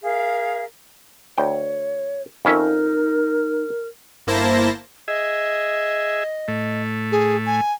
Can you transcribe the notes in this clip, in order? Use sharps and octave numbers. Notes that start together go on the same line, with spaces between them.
G#4 A#4 E5 F5
D2 C#5 G5
F2 C#4 D#4 A#4 E5
G1 A#3 E4 C5 A5 A#6
G#4 D#5 E5
A2 A3
G#4
G#5